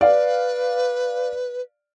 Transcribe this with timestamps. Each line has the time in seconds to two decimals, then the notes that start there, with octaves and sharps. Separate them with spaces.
0.01 B4 D5 F5